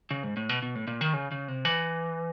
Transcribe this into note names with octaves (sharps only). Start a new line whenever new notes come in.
C#3
G#2
A2
B2
B2
A2
A#2
D#3
C#3
C#3
C3
E3